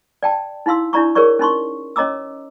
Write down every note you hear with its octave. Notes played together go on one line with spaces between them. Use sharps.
D5 G5 A5
D#4 E4 F5 C6 E6
D4 E4 D5 A#5 C#6
G#4 A#4 C#5 D5 C#6
C#4 D#4 C6 C#6
C#4 C#5 D#5 A#5 D6 E6